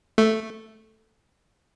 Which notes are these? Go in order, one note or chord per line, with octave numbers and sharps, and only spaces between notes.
A3